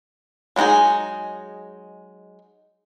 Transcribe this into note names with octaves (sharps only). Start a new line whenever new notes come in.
F#3 G#3 B3 D#4 G#4